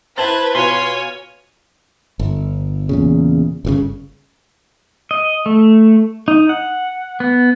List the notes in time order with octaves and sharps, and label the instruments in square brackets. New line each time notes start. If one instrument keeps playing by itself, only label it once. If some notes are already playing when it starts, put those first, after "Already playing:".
[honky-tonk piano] E4 A5 A6 [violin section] B4 [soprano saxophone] C5 [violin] F#6 G#6
[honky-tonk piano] B2 F4 [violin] C#5 G#5 [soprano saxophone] C6
[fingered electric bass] G1
E2 A#2 C#3
G1 A#2 C#3
[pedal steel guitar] D#5
A3
D#4
F#5
B3